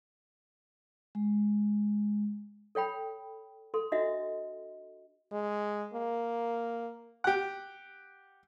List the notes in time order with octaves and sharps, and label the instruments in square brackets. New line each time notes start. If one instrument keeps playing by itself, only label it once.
[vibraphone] G#3
[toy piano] A4 C#5 G5 B5
A4 C6
D4 F#4 D#5 E5
[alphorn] G#3
A#3
[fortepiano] G4 F#5